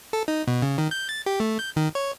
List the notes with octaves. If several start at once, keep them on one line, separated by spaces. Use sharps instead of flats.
A4
D#4
B2
C#3
D#3
G6
A6
G4
A3
G6
D#3
C#5